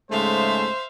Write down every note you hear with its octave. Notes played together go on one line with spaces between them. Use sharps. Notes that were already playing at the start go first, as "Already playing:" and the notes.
G#2 C#3 G#3 A3 C5 E5 F5